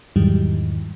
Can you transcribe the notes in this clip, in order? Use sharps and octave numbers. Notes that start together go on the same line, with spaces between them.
E2 G#2 D#3 F#3 G3